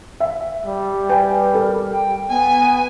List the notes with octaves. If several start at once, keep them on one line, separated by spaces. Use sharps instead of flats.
E5
G3
B4 G5 G#5
A4 A#4
G5
B3 G#5